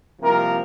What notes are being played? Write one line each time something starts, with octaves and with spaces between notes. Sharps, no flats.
C2 C3 F3 A#3 A#4